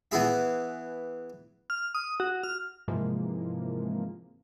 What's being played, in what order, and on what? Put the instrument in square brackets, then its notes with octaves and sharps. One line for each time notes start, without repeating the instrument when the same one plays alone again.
[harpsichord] E3 B3 E4 G#4 E5
[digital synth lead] F6
D#6
F#4
F6
[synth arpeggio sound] G#2 C3 E3 F3 G#3 A#3